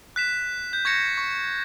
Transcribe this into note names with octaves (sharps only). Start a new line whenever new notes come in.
F#6 B6 E7
G6
C#6 G#6 A#6 C#7 E7
C#6